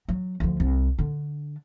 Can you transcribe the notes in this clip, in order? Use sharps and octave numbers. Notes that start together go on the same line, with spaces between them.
F#3
D2 F3
C2
D3 D4